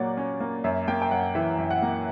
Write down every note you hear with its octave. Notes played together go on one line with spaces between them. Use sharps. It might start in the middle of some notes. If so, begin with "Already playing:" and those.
Already playing: A#2 F#3 A#3 D5 F#5
C#4
A#3
F#2 E5
A#3 G5
G5
F#2 F#5
E3 E5
F#2
F#5
A#3